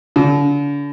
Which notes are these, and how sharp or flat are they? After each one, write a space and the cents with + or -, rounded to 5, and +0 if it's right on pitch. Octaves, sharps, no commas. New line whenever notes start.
D3 -40